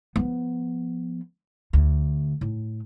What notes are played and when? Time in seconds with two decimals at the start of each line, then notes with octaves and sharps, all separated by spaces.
0.16 F3 B3
1.73 D2
2.41 A2